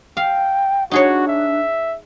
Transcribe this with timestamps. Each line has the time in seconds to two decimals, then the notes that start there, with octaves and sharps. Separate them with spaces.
0.17 F5 G5
0.91 D4 D#4 F#4 G#4 C#5
1.28 E5